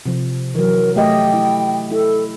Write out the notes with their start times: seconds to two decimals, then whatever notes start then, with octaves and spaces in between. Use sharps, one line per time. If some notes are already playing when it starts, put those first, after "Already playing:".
0.06 C3 F3
0.55 E3 F#3 A#4
0.96 A3 G4 D#5 G5
1.34 E4
1.91 E4 A4